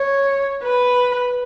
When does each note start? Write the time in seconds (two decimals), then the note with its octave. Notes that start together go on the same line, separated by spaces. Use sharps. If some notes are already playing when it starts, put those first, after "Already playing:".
Already playing: C#5
0.63 B4